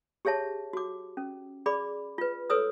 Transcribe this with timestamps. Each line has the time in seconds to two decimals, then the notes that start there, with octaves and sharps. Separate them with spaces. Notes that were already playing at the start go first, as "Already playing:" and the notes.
0.25 G4 G#4 C#5 E5 A5
0.73 F#4 D6
1.17 C#4
1.66 G#4 D5 B5 D6
2.18 F4 B4
2.50 A4 B4 C#5 D#6 E6